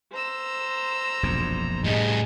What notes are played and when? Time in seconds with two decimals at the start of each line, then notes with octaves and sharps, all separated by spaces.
0.12 C5 A#5 E6
1.23 E1 A#1 F#2
1.84 A2 G3 G#4 D#5